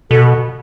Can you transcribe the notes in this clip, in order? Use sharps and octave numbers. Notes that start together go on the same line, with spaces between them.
B2 A4